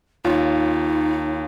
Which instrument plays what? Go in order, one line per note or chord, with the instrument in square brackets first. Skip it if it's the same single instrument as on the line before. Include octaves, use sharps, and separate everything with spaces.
[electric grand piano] D#2 C#5 [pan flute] D#4 [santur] F4